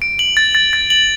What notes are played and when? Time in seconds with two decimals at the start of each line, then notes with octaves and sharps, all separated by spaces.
0.02 D7
0.19 F#7
0.37 A6
0.55 A6
0.73 A6
0.90 F#7